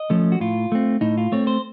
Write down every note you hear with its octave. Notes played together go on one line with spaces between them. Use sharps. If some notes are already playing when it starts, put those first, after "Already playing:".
Already playing: D#5
F3 A3 C#4
F#4
A2 F4
A3 C4
A2 D#4
F4
A3 C4 C#5
C5